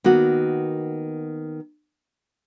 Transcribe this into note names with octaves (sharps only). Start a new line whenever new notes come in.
D#3 A#3 B3 F#4